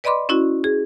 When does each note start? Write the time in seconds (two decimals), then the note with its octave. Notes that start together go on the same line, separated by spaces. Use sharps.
0.04 B4 D5 D#5 B5 C6 D6
0.29 C#4 E4 F#4
0.64 G#4